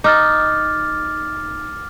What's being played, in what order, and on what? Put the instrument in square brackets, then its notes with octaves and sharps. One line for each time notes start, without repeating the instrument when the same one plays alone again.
[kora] D#4 [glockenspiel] D6 F6 A6